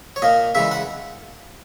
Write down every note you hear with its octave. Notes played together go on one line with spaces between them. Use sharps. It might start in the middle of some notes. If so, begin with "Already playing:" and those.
C#5
A#2 A#3 D#5
C#3 E3 G#3 E5
F#5